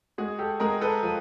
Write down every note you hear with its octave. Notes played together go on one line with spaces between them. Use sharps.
G#3 F#4 G#4
G4 A4
G#3 G#4 A#4
A4 B4
F3